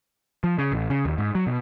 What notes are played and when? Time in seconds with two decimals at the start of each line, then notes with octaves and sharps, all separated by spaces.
0.44 F3
0.58 C#3
0.72 A1
0.90 C#3
1.05 D#2
1.18 G#2
1.35 F#3
1.47 B2